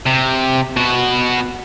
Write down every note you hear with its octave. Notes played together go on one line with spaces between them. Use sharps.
C3
B2 F#4